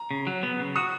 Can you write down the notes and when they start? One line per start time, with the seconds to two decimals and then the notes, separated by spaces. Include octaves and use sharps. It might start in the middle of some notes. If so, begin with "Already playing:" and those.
Already playing: A#5
0.11 C#3
0.27 F#3
0.43 B3
0.60 C#3
0.76 F#4 D#6